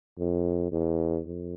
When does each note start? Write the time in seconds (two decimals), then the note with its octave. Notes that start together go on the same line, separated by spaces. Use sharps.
0.18 F2
0.72 E2
1.26 F2